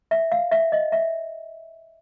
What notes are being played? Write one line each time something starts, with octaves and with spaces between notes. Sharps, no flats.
E5
F5
E5
D#5
E5